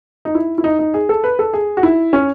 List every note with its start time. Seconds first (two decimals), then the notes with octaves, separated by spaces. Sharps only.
0.25 D#4
0.35 E4
0.58 E4
0.64 D#4
0.79 D#4
0.94 G#4
1.09 A4
1.24 B4
1.39 A4
1.54 G#4
1.77 F#4
1.83 E4
2.13 C#4